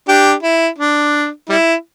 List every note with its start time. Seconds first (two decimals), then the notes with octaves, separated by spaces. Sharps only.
0.08 D4 G4
0.43 E4
0.79 D4
1.49 G3 E4